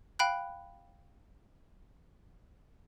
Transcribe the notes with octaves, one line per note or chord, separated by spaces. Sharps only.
F5 G5 B5 F#6